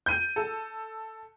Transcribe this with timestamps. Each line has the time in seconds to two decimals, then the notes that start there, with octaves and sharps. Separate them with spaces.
0.06 G6 D#7
0.36 A4